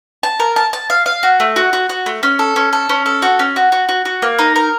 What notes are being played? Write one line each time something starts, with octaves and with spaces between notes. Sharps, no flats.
A5
A#4
A5
A5
F5
F5
F#4
A3
F#4
F#4
F#4
A3
C#4
A4
C#4
A4
C#4
A4
F#4
C#4
F#4
F#4
F#4
F#4
A#3
D#4
A#4